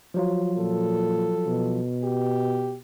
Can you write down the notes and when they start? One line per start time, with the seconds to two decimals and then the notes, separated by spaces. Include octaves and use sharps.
0.14 F3 F#3 F4
0.58 A#2 A4
1.47 B2
2.03 G4